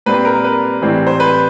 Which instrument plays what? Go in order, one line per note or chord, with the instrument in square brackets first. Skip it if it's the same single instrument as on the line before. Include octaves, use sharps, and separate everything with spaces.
[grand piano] A#2 G3 C4 B4
A#4
B4
A2 E3 G3 C4
C5
B4